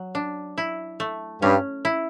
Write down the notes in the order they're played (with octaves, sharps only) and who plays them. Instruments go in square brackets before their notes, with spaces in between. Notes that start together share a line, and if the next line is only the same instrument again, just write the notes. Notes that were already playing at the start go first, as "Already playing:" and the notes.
Already playing: [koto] F#3
D4
E4
A3
[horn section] G2 [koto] C#4
[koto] E4